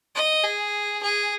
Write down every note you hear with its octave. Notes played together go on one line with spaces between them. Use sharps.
D#5
G#4
G#4